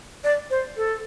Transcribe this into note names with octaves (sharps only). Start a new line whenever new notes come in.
D5
C5
A4